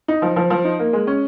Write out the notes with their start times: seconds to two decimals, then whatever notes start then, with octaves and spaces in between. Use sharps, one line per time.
0.08 D#4
0.22 F3
0.36 F3
0.50 F3
0.64 D#4
0.79 A#3
0.93 G#3
1.07 C#4